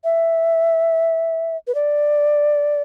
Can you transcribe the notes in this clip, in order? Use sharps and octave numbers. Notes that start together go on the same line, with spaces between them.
E5
B4
D5